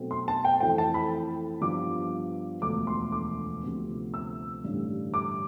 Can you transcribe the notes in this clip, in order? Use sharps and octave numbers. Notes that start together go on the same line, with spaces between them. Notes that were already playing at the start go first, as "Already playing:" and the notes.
Already playing: B1 B2 A3 C4
C6
A5
G5
F2 E3 A3 C4 G5
A5
B5
G2 F3 B3 D6
E1 D2 D3 F3 B3 D6
C6
D6
D2 C3 F3 B3
E6
A1 G2 D3 G3
D6